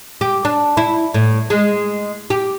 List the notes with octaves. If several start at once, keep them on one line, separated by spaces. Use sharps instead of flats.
G4
D4
E4
A2
G#3
G4